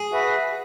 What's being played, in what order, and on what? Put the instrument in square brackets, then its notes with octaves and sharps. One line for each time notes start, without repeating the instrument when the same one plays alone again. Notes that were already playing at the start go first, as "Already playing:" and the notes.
Already playing: [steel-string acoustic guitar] G#4
[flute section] F#4 B4 E5